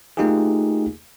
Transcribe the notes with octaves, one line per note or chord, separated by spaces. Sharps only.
A3 A#3 D#4 F4 G4 G#4